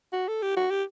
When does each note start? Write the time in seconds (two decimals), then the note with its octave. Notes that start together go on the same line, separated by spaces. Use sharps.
0.13 F#4
0.28 A4
0.42 G4
0.56 F#4
0.71 G4